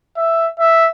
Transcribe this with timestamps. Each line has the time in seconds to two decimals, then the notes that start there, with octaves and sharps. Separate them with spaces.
0.17 E5
0.60 E5